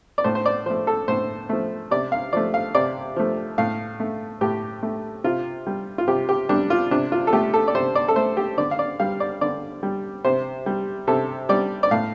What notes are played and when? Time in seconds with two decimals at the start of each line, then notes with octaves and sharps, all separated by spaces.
0.18 D5
0.24 A2 C5
0.35 C5
0.46 D5
0.66 F3 A3 C5
0.87 A4
1.08 A2 C5
1.49 F3 A3
1.91 C3 D5
2.12 F5
2.33 F3 A3 D5
2.54 F5
2.75 C3 D5
3.16 F3 A3
3.58 A2 F5
4.00 A3
4.41 A2 G4
4.83 A3
5.24 C3 F4
5.67 G3
5.98 F4
6.08 C3 G4
6.29 G4
6.49 G3 D4
6.70 F4
6.91 C3 D4
7.12 F4
7.27 A4
7.33 A3 G4
7.54 A4
7.68 D5
7.75 C3 C5
7.95 D5
8.08 A4
8.16 A3 C5
8.37 G4
8.58 D3 D5
8.71 F5
8.79 D5
9.00 G3 F5
9.20 D5
9.41 D3 D5
9.83 G3
10.25 C3 C5
10.66 G3
11.07 C3 A4
11.49 G3 D5
11.83 D5
11.91 A2 F5